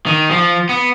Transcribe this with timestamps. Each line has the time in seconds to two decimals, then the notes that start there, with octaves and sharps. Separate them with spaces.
0.06 D#3
0.31 F3
0.69 B3